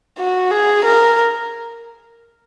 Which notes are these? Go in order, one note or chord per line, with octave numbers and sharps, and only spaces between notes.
F#4
G#4
A#4